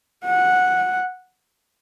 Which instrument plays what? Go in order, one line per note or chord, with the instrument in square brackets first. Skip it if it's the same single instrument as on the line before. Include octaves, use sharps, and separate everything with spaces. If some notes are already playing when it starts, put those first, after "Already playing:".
[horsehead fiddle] F#5